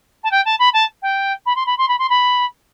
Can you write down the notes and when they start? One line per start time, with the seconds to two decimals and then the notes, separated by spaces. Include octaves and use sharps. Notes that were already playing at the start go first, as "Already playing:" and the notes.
0.24 A5
0.31 G5
0.45 A5
0.59 B5
0.73 A5
1.02 G5
1.46 B5
1.56 C6
1.66 B5
1.78 C6
1.88 B5
1.99 C6
2.10 B5